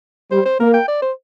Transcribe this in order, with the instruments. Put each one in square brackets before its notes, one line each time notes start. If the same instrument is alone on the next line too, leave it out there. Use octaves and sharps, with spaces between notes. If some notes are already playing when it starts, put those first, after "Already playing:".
[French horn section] G3 [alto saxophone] C5
[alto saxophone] C5
[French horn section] A#3 [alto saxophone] A#4
[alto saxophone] G5
D5
C5